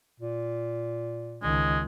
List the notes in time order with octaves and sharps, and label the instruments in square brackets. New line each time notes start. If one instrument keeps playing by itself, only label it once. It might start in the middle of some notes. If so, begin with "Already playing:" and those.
[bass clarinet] A#2
[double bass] C#2 D#3 [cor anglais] G#3